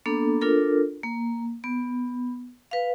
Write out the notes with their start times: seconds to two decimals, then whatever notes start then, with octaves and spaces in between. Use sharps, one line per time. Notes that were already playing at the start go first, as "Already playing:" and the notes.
0.06 A#3 B3 D4 A4
0.41 D4 F4 A4 A#4
1.03 A#3
1.64 B3
2.71 B4 F5